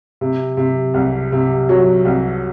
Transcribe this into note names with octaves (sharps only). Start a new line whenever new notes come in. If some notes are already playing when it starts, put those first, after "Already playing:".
C3
C3
C2
C3
F#3
C2